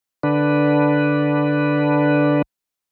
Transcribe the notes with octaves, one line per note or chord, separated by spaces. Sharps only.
D3 D4 B4